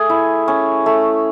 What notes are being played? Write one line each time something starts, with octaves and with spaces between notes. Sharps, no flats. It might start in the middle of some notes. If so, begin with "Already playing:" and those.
Already playing: A3 G#4
E4
C#4
A3